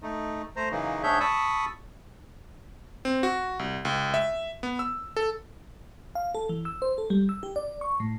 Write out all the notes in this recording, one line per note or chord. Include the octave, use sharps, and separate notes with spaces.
A3 D#4
A3 C5 A#5
C#3 E3 F#3 A#3 D#4
G#2 D4 G#4 C#5 E5 G6
A5 B5 C#6 D#6 E6
C4
F#4
C2
C#2
E5
B3
E6
A4
F5
A4
E3
E6
C5
A4
G3
E6
G4
D5
C#6
A2